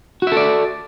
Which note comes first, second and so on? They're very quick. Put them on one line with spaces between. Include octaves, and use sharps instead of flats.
F#4 E5 A4 D5